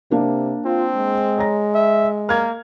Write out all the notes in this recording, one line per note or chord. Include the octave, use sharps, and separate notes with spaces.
C3 A#3 D4 A#4
C4 F4
G#3
C#5 A#5 A#6
E5
A#3 F6 G#6